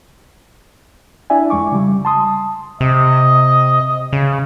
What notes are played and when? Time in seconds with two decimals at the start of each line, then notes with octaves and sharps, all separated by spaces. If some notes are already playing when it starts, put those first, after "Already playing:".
1.30 D4 E4 D5 E5 G#5
1.50 F2 G#3 C#6 D6
1.72 C#3 G3
2.05 A5 C6 D#6
2.81 C3 D#5
4.13 C#3